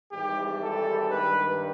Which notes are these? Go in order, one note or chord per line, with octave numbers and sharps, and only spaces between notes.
G#1 G#2 E3 G3 G4
A4
G2 D#3 G3 B4